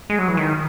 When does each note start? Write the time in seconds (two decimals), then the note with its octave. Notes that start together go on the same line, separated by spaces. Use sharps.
0.10 G#3
0.19 F#3
0.28 E3
0.37 D#3